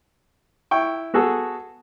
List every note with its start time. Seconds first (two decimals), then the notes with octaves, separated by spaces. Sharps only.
0.71 E4 G5 C#6
1.14 B3 F#4 G#4 A4